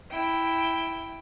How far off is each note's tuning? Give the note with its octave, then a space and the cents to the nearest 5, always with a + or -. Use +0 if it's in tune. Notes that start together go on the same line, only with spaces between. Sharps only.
E4 +0 G5 +0